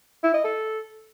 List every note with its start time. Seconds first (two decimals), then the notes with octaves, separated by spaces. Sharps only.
0.24 E4
0.34 D#5
0.44 A4